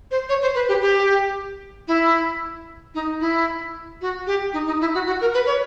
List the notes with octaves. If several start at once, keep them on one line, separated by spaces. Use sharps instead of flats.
C5
C#5
C5
B4
G4
G4
E4
D#4
E4
F#4
G4
D#4
D#4
E4
F#4
F#4
A#4
B4
C#5